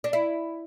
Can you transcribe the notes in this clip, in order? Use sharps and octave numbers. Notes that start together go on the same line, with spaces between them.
D4
E4